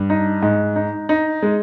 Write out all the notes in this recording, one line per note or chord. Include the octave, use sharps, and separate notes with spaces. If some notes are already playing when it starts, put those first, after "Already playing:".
Already playing: G2
D#4
G#2
D#4
D#4
G#3